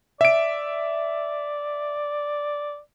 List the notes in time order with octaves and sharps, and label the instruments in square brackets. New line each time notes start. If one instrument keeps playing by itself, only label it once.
[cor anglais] D5 [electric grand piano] E5 D7